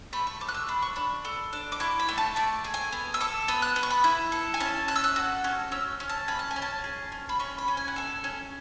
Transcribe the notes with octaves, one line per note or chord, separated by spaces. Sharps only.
A3 B5
C#6
A3 D6
F#6
E6
D4 B5
C#6
D4 B5
A4
D4
D6
E4 C#6
B5
A3
A5
A3 D5
G#4
G#5
B3
E6
A4 D6
B3 E6
F#6
B3
C#6
B5
E4
A4
G#5
C#4 A5
A4 F#6
E6
F#6
F#4
C#4
C#4 E6
C#4
A5
C#4 B5
A5
G#5
C#4
A5
G#4
C#4
B5
C#4 C#6
B5
C#4
G#5
F#5
A4 G#5
C#4